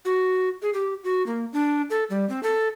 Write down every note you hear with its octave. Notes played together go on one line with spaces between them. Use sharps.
F#4
G#4
G4
F#4
A#3
D4
A4
G3
C4
A4